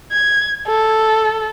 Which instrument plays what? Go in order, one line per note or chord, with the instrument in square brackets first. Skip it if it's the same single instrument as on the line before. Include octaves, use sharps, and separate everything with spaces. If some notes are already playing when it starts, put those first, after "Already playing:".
[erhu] G#6
A4